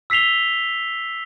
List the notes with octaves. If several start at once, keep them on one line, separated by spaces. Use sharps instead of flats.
E6 B6 C7 F7 G7